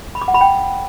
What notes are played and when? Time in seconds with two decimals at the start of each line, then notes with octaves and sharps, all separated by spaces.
0.15 B5
0.21 D6
0.28 F#5
0.34 B5
0.41 G5